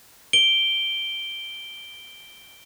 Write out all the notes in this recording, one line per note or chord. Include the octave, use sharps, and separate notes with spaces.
D7 G7